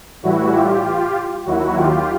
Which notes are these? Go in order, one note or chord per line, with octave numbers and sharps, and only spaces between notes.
A2 E3 G3 E4 F#4
F4 G4
F4 G4
D#2 D#3 F#3 E4 F#4
F4 G4